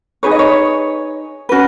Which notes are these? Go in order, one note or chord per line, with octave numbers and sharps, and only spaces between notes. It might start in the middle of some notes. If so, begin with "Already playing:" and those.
D#4 G#4 B4 C#5
D#5
C#5
C#4 F#4 B4